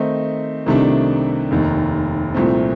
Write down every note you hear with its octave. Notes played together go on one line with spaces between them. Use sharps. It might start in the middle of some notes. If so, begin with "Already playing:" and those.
Already playing: D#3 A3 C4 D#4
C2 C3 D#3 A3 D4
F1 D#2 D#3
C2 A#2 F3 A3 C4